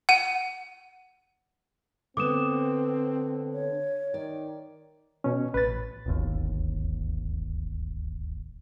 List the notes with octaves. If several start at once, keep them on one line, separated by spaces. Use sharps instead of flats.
F#5 D#7
D3 B3 C4 D6 D#6 E7
C#5
D#3 D5
B2 C#4
A1 B4 A6
D1 G1 D#2